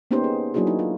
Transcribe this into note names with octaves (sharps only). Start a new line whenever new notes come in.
A#3 B3 C#4 D#4 G4 C5
G#4
F#3 A#3 D4 E4 F#4 G#4
D#4
F4